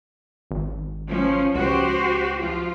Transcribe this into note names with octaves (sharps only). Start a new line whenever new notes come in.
G#1
F3 C#4
C#2 F#4 G4 C5
F3 F4